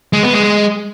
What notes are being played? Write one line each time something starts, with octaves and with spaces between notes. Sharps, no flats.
G#3
B3
G#3
G#3